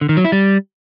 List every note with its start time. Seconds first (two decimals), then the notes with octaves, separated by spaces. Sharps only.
0.01 D3
0.09 D#3
0.17 F#3
0.25 E4
0.32 G3